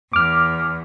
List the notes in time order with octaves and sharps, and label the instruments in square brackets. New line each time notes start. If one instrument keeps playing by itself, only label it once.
[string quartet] E2 [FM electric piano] D6 F6